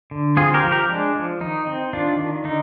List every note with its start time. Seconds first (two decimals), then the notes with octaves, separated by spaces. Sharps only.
0.11 D3
0.37 C4 F4 G#4
0.54 G4 A#4
0.64 F3
0.72 G4 A#4
0.89 G#3 D4
1.15 F3
1.41 D#3 D#4
1.67 C4
1.93 D#3 D4 F4
2.19 D#3
2.45 D3 D#4